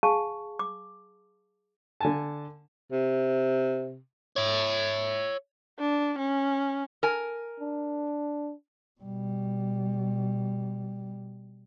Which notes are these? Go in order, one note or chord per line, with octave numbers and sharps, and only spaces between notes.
G#4 F5 G#5 A5 C#6
D6
D3 G#5 A5
C3
C#5 E5
D4
C#4
A#4 G#5
D4
B2 G3